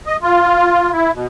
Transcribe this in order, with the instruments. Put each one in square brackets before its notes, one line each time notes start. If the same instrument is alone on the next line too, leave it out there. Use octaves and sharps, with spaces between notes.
[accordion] D#5
F4
E4
B2